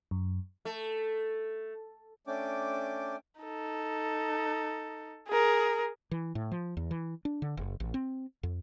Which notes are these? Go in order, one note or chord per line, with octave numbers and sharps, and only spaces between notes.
F#2
A3
A3 C#4 D4 G5 D6
D#4 A4
G#4 A#4
E3
A2
F3
E2
E3
D4
D3
F#1
A1
C4
F2